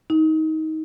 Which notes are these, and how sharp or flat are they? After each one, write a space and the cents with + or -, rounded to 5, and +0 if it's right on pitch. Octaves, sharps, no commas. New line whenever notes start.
D#4 +20